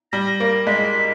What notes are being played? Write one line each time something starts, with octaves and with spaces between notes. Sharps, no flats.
G3 A#6
A#3
G#3 B6